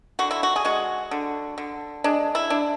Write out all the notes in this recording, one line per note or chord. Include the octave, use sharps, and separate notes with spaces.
D3 F#4
E4
F#4
G#4
G#3 F#4
D3
D3
G#3 D4
E4
D4